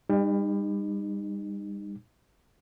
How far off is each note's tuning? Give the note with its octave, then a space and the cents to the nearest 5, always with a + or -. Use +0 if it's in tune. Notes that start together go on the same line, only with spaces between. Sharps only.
G3 +35 D#4 -25